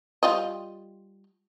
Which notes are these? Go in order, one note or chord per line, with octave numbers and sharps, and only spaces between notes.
G3 F4 D#5